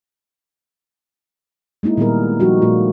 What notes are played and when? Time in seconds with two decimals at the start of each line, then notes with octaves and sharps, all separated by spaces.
1.83 G#3 A#3 D#4 E4
1.97 A#2 D#3 G3 B3 G#4 A#4
2.40 F3 G3 D#4 F#4 G4
2.62 A#2 A3 F4